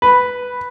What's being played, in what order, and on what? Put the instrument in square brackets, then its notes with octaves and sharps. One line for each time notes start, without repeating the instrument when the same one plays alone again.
[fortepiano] B4